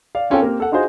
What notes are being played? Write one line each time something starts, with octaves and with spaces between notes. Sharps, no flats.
D5 F5
C4 C#4 F4 A4 C#5 G5
A#3 C4 G4 A#4
A4 F#5
D#4 F4 F#4 G#4 C5 D#5